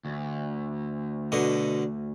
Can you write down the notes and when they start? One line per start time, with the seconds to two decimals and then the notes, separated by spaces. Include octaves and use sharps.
0.05 D2
1.32 B2 D3 D#5